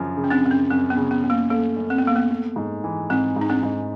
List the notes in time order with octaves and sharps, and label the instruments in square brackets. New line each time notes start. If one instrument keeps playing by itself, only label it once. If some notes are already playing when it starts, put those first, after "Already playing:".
Already playing: [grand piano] F#2 C#3 F3
C#3
[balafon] C#4
C4 D4
[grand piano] F#2 [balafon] C4
[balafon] C#4
[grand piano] F#2 [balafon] C4
[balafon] B3
[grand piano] C#3
[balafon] B3
[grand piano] C#3 [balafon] B3
[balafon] A#3
[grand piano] A3 [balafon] A#3
[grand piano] F#2
[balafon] C4
B3
[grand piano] A3 [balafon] A#3
[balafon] B3
[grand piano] A3
G#2
E3
[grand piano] G#2 [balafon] C4
[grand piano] G#2
[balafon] D#4
C4 D4
[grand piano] G#2